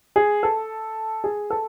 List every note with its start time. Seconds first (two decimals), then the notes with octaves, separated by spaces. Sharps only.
0.16 G#4
0.43 A4
1.24 G#4
1.50 A4